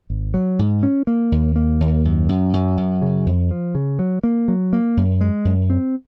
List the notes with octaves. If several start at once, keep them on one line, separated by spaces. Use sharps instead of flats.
G#1
F#3
G#2
C#4
A#3
D#2
A#3
D#2
F#2
F#2
F#2
F#2
C#3
F2
F3
C#3
F#3
A#3
F#3
A#3
F#2
G#3
F#2
C4